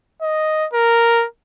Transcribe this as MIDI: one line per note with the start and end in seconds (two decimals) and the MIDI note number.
0.22 0.66 75
0.73 1.25 70